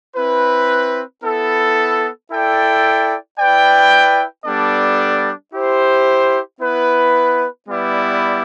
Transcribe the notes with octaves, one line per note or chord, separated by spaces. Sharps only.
C4 E4 B4
B3 E4 A4
E4 A4 D5 G5
E4 B4 D5 G5
G3 B3 D4 A4 D5
E4 G4 C5
B3 E4 B4
G3 B3 E4 B4 D5